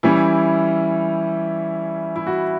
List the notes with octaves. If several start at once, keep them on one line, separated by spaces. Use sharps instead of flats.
E3 G3 C#4 E4
E4
F#4